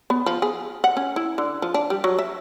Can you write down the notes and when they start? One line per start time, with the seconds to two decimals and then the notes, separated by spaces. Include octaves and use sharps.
0.10 B3
0.26 F3
0.42 G#4
0.84 F#5
0.97 C#4
1.16 E4
1.38 D3
1.62 F3
1.74 D4
1.90 G3
2.04 F#3
2.19 E5